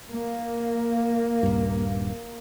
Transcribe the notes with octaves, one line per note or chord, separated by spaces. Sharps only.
A#3
D#1 G2